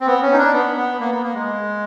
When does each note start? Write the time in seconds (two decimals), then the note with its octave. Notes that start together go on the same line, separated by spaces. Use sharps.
0.01 C4
0.06 B3
0.22 C#4
0.33 D#4
0.38 D4
0.53 B3
0.77 B3
1.00 A#3
1.11 B3
1.23 A#3
1.34 G#3